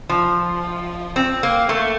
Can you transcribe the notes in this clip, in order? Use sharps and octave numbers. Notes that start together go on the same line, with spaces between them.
F3
C4
A#3
A3